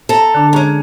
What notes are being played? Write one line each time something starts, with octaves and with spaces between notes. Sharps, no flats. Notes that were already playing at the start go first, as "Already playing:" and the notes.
A4 A#5
D3 D4
G#3 C#4 A#5